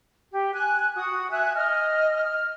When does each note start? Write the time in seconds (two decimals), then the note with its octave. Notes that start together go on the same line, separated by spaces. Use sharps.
0.32 G4
0.54 G#5 F#6
0.96 F#4 D#6
1.31 E5 G#5 F#6
1.55 D#5 F6
2.25 F6